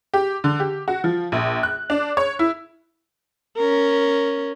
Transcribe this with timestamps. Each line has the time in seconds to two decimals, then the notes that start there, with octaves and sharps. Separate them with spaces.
0.14 G4
0.44 D3
0.60 G4
0.88 F#4
1.04 F3
1.32 A#1
1.63 F#6
1.90 D4
2.17 C#5
2.39 E4
3.57 C#4 A#4